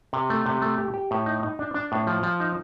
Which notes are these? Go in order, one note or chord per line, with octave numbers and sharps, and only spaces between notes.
C3
A3
C3
A3
G4
G4
A2
D#4
D#4
D4
D4
A2
F3
F3
D#4